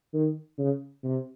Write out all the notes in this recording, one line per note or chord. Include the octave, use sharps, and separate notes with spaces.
D#3
C#3
C3